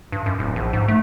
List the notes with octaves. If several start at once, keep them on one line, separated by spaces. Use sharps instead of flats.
G2
F#2
D1
A#1
G#2
A3